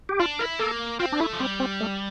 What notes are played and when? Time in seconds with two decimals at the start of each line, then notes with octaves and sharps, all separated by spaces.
0.09 G4
0.20 D4 F4
0.39 E4 A#4
0.59 A#3 A4
0.99 C4 F4
1.12 D4
1.20 A3 E4
1.33 F3
1.40 G3 C4
1.60 C4
1.81 A3